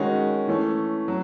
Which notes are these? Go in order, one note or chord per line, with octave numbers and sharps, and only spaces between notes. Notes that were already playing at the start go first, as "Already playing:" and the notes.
Already playing: D#3 G#3 C#4 F#4
E3 A3 C#4
F#3